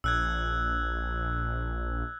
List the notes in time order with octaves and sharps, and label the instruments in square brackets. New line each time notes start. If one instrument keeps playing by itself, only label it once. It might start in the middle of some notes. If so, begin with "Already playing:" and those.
[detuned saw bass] A#1 [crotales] E6 F#6 G#6